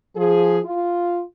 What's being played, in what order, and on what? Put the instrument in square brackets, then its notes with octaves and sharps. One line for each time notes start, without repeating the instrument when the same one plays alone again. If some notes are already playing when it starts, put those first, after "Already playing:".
[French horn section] F3 G#4
F4